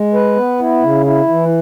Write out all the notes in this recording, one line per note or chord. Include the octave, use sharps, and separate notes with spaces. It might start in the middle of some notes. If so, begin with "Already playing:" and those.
Already playing: G#3
B4
B3
E4
C#3
E4
E3